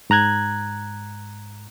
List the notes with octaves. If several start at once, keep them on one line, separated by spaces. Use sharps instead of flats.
G#2 A#5 F#6 G#6